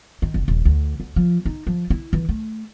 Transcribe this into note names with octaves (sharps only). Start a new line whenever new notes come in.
D#3
F#1
D#1
D2
D2
F3
D#4
F3
E4
E3
A3